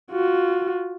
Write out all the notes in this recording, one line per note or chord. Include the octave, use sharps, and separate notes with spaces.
F4 F#4